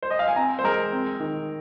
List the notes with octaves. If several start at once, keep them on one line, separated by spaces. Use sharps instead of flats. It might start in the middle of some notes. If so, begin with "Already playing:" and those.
C5
D#5
F5
G#5
C4 A#5
C5
G#3 A#4
C4
D#3